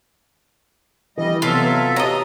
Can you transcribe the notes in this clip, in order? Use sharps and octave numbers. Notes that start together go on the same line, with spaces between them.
E3 G3 D#5
C3 F#3 B3 F4 A4 E5
G4 C#5 D#5 A#5